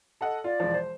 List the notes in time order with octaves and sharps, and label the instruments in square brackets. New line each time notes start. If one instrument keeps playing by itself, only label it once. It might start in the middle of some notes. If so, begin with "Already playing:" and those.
[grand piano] A4 D#5 F#5
[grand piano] F4 [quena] D5
[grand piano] E1 F3
C5